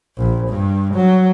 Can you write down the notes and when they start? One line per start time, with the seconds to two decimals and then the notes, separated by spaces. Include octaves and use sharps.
0.18 A#1
0.48 G2
0.94 F#3